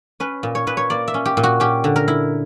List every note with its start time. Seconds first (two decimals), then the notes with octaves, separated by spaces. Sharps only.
0.20 C#4 B4
0.43 A#2
0.55 C#5
0.67 A#2 B4
0.77 C#5
0.90 A#3 D5
1.08 E5
1.14 C#4
1.25 G4
1.37 A#2
1.43 F#4
1.60 C#4 G4
1.84 D3
1.96 A#4
2.08 E4